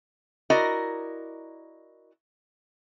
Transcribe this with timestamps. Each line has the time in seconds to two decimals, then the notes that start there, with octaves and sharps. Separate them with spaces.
0.50 E4 F#4 A#4 D5 D#5